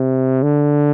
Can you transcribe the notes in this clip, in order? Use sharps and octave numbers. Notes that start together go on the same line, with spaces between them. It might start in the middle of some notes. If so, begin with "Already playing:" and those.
Already playing: C3
D3